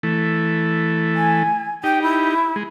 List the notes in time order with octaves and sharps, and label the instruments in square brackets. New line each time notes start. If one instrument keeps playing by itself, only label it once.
[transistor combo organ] E3 A3
[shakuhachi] G#5
[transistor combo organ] D#4 G4 [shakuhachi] G5
[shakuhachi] E4
[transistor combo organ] G#3